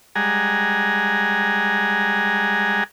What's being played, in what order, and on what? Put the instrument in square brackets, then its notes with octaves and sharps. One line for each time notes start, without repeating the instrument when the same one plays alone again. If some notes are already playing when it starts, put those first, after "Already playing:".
[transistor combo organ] G3 G#3 F#5 G#5 A#5